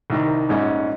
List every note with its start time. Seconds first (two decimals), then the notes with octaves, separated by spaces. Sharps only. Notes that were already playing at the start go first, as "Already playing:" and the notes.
0.10 C2 C3 D#3
0.49 A#1 G#2 G3 C#4